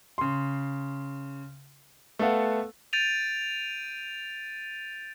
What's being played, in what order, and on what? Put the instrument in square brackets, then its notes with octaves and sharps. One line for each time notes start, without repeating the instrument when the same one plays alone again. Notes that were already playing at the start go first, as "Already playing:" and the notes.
[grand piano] C#3 C6
A3 B3 A4 F5 F#5
[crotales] G6 A6 D7 D#7 F7